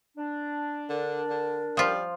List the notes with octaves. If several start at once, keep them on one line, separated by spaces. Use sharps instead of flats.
D4
D3 A#4
D3
F3 G3 F4